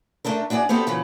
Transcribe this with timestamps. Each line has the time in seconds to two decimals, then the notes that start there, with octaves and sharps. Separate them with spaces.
0.25 A3 D4 A4 A#4
0.50 D4 F#4 G#4 C#5 D5
0.69 B3 C4 F#4 G4 A4
0.87 A#2 C#3 E3 F#3